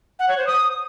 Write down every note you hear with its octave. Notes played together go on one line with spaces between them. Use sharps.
F#5
C#5
C5
D#6